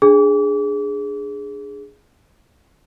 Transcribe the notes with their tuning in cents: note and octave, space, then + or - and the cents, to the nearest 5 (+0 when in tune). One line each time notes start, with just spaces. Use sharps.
D4 +0 G#4 +0 D6 -35